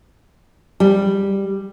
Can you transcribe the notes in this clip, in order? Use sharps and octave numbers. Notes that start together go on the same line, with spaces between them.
G3